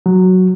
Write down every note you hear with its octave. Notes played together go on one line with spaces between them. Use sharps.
F#3